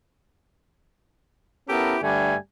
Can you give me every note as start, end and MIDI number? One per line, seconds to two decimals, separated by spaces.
1.68 1.96 59
1.68 1.96 61
1.68 1.96 64
1.68 1.96 67
1.68 1.96 69
1.68 1.96 70
2.02 2.35 43
2.02 2.35 50
2.02 2.35 55
2.02 2.35 57
2.02 2.35 62
2.02 2.35 80